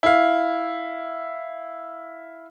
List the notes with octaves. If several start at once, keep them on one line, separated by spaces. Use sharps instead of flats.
E4 F5